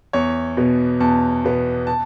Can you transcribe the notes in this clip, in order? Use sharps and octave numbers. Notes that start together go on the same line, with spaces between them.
E2 C#5
B2 B3
E2 A5
B2 B3
A5